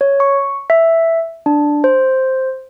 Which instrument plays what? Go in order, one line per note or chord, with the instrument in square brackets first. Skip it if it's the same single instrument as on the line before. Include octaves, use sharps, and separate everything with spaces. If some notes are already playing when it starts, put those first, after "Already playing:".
[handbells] C#5
C#6
E5
D4
C5